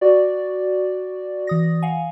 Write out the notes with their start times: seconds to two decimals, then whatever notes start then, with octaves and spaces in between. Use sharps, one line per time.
0.01 F#4 D5
1.47 E3 D#6 A#6
1.83 F5 F#5 G#5